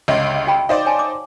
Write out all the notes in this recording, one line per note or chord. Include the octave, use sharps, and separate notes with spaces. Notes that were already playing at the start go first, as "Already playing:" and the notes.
G1 C#2 C#5 D#5 E5
F#4 G5 B5
D#4 C5 D5 F5
C#5 G#5 A5
D6